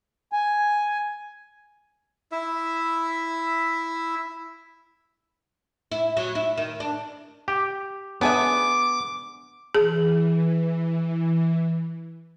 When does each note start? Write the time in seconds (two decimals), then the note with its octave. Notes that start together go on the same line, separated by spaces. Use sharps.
0.32 G#5
2.32 E4 E5
5.92 E4
6.17 F#3
6.35 E4
6.57 D#3
6.80 D4
7.48 G4
8.21 B3 D4 G#4 E5 D6
9.75 E3 G#4